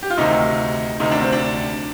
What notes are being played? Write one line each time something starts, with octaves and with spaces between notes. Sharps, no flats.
G4
F4
D2 C3 D#3 D#4
D2 C3 D#3 D#4
D4
C4
D4